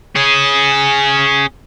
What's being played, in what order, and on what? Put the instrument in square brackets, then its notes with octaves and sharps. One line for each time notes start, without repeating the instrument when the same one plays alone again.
[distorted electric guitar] C#4 G#4